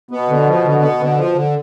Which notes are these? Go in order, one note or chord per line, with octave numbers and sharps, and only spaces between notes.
B2 B3
D3
F3
D3
B3
D3
F3
D3